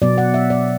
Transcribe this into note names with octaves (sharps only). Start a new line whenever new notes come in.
B2 F#3 B3 D5
F#5
E5
D5